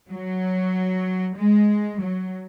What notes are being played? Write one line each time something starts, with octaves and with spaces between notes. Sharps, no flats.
F#3
G#3
F#3